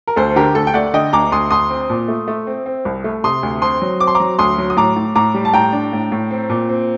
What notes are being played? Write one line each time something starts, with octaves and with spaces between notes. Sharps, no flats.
A#4
D2 A4 C5
D3 G4 A#4
D2 A4
G5
A3 D5 F#5
D3 D#5 G5
D2 A#5 D6
D2 C6 D#6
D2 C6 D#6
C4
A#2
A3
A3
C4
C4
C2
A3
C3 C6 D#6
D2
C4 C6 D#6
F#3
C4 D6
C6
A#5 D6
F#3
D2 C6 D#6
F#3
D#6
A2 A#5 D6
A2
A2 A#5 D6
G3
A5
A2 G5 A#5
D4
A2
A2
C4
A#2
C4